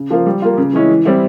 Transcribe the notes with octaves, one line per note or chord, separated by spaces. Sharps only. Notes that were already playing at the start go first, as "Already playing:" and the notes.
Already playing: C#3
F3 A#3 F4
G3
A#3 F4
C#3
E3 G#3 C#4 E4
E3
G3 C4 E4